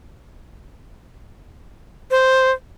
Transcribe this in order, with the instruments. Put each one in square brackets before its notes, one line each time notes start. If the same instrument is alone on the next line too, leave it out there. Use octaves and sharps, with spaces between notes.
[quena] C5